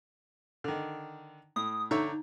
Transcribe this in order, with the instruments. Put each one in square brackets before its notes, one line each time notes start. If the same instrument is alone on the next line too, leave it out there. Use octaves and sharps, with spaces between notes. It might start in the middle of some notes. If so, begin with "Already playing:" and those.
[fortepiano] D3 D#3
[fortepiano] A2 [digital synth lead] D#6
[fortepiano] D3 C#5 E5 [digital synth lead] D#4